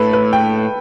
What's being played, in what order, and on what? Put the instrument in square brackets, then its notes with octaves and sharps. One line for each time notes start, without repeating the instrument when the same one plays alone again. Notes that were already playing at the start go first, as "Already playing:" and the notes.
Already playing: [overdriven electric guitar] A2 [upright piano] A4 B4
[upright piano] B4
G5